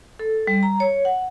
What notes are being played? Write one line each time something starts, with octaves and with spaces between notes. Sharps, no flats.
A4
G3
A#5
C#5
F#5